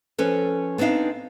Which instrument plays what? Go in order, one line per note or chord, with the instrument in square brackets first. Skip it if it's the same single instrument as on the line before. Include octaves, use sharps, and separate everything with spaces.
[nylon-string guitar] F3 C#4 A4 B4
B3 C4 D4 D#4 F5